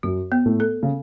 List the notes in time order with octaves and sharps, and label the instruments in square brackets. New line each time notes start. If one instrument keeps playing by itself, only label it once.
[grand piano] F#2 F#3 [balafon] F#4
[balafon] B3
[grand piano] A2 A3
[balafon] A4
[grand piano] C#3